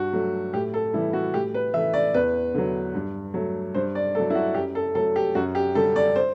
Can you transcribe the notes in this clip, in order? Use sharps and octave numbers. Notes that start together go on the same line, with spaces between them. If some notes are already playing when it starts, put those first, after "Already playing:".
Already playing: G2 F#4
F#3 A3
A2 G4
A4
E3 G3 E4
F#4
A2 G4
B4
E3 A3 E5
D5
E2 B4
D3 F#3
G2
F#3 A3
G2 C5
D5
F#3 A3 A4
E4
F#4
F#2 G4
A4
F#3 A3 A4
G4
F#2 F#4
G4
D3 G3 A4
D5
C5